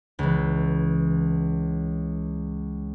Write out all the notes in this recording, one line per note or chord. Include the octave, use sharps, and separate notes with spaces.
C#2 E3